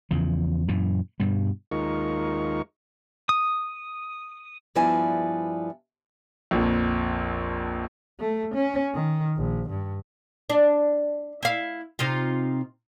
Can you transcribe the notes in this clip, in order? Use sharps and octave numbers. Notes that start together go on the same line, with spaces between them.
E2 C#3 F3
F#2 A#2 E3
G2 B2 G3
D#2 G#3 D#4 F4 A#4 C#6
D#6
G2 F3 B3 E4 D5 G#5
A#1 F2
A3
C#4
D#3
A#1
G2
D4
E4 F5
C3 D#4 F4